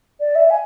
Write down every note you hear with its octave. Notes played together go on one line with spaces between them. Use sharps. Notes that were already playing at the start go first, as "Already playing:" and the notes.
D5
E5
G#5